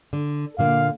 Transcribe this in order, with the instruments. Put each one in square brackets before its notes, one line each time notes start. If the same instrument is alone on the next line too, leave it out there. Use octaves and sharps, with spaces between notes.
[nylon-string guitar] D3
[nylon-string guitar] A#2 D3 A#3 [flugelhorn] F5